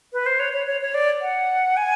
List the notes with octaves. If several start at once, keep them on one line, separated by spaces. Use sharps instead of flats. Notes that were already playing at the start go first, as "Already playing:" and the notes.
B4
C5
C#5
C#5
C#5
C#5
D5
F#5
G#5